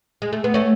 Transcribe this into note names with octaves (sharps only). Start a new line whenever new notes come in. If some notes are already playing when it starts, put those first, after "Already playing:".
G#3
A3
B3
A3 C#4